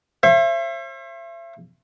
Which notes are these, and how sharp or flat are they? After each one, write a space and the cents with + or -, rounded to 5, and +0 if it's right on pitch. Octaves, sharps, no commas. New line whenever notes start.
C5 +45 E5 +40